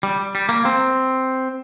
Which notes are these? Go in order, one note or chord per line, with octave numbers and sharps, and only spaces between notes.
G3
G3
A#3
C4